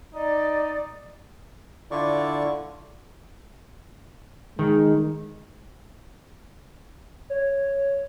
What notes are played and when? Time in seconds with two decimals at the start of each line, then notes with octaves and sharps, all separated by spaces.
0.14 D#4 D5
1.91 D3 E4 F4 D5 C#6
4.59 D#3 G#3
7.30 C#5